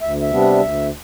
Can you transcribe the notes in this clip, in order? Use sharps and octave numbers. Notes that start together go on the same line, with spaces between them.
D2 E5
E5
C3 G3 B3 D4
D2